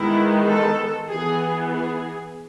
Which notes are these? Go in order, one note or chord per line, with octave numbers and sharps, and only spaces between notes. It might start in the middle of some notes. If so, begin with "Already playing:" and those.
Already playing: D#3 G#3 B3 E4
A4
E3 B3 G#4
G#4